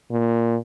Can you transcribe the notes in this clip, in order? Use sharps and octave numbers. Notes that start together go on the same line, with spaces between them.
A#2